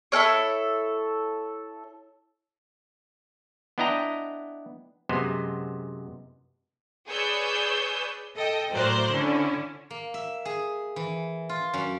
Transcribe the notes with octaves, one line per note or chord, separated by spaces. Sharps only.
E4 A4 A#4 C#5
B3 D4 E4 D#5 G5 A#5
F#2 C3 G#3 B3 C5
G#4 B4 C#5 D5 E6 G6
A4 D#5 G5
A2 F#3 A#4 C5 D5 F#6
D3 C#4 E4
A#3
E5
G#4
E3
F4
F#2